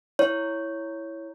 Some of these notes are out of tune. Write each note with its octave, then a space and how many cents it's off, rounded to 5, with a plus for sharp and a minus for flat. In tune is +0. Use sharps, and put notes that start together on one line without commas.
E4 +0 C#5 +0